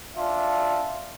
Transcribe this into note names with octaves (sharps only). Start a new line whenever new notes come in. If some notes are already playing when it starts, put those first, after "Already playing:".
D4 F4 E5